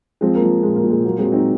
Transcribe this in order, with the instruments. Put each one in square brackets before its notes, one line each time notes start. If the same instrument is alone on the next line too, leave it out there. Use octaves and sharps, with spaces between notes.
[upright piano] F3 G#3 C4
A#3
F3
A#2 G#3
A#3
A#2
G#3
F#3 A#3
G#3 C4
F#3
C4 D#4